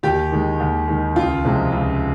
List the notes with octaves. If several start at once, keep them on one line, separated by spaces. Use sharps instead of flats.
D#2 G4
D#3 G#3
D#2
D#3 G#3
C#2 F4
C3 F3 G#3
C#2